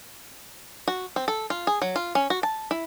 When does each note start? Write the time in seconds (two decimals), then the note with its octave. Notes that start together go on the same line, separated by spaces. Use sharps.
0.88 F#4
1.16 C4
1.28 A4
1.50 F4
1.67 G#4
1.82 F#3
1.96 F4
2.15 C#4
2.30 F#4
2.43 A5
2.71 E4